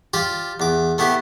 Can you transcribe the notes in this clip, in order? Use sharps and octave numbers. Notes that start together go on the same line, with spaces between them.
F4 G4 D5
E2 D6
A3 B3 E4 G4